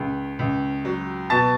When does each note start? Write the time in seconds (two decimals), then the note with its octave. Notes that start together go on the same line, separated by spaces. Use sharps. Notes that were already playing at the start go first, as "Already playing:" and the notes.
Already playing: C#2 C#3
0.39 C#2
0.85 F#3
1.30 B2 A5 A6